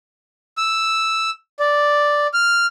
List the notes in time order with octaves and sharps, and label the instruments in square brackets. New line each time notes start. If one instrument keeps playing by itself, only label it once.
[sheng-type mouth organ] E6
D5
F6